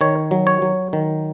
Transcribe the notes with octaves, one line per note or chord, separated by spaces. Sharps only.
D#3 C#5
F#3
C#5
F#3
D#3